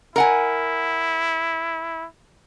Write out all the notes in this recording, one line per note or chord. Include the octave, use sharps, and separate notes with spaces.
E4 A#4 F#5 G#5